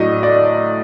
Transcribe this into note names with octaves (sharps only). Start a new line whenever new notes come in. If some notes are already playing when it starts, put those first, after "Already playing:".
Already playing: A2 F#3 A3 D4 D#5
D5